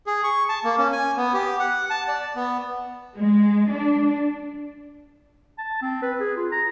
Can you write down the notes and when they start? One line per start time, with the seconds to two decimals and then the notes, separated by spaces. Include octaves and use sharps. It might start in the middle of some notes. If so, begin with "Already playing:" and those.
0.06 G#4
0.24 C#6
0.49 A5
0.64 A#3
0.78 C#4
0.93 G#5
1.17 B3
1.33 G4
1.59 F#5
1.90 A5
2.08 D5
2.36 B3
3.16 G#3
3.70 D4
5.58 A5
5.82 C4
6.02 B4
6.20 G#4
6.37 F4
6.52 A#5